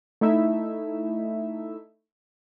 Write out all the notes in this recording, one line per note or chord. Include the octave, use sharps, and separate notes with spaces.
A3 D#4 E4 E5